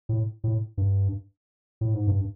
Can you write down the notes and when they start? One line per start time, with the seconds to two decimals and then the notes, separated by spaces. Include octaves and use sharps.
0.09 A2
0.44 A2
0.78 G2
1.81 A2
1.94 G#2
2.07 G2